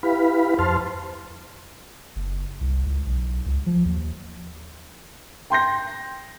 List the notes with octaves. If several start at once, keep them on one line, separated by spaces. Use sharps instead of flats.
E4 G4 B4 F5 B5
F2 C5 A5 C6 F6
F#1
C2
C#2
B1
C#2
F3
D#2
G5 C6 G6 A#6